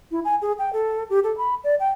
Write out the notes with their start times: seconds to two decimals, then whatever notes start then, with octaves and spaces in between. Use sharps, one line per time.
0.11 E4
0.25 G#5
0.42 G#4
0.59 G5
0.73 A4
1.10 G4
1.24 A4
1.38 B5
1.64 D5
1.80 G5